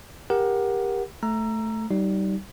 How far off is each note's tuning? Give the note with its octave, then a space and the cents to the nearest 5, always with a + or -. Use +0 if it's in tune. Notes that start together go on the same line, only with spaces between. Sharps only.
G4 +20 A#4 +15 F#5 +0
A3 +0 A#5 +0 E6 +25
G3 -25 D#4 +0